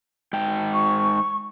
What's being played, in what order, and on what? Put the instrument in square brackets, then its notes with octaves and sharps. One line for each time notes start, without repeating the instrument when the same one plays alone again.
[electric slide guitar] G#2 G5
[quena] C#6